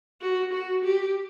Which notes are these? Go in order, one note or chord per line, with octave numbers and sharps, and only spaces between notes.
F#4
F#4
G4